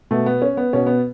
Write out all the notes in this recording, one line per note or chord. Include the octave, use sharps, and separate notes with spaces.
B2 A3
B3
C#4
B3
B2 C#4
B3